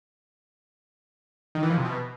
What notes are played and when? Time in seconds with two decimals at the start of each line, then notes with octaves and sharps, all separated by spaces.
1.55 D#3
1.62 E3
1.70 F3
1.77 C3
1.85 B2